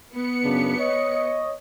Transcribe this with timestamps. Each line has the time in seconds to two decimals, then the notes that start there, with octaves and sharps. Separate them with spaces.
0.12 B3 C#7
0.44 F#2 C#3 D4
0.78 C#5 D#5